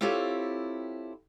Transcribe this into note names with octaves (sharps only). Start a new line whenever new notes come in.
C4 E4 F4 G4 A4 C#5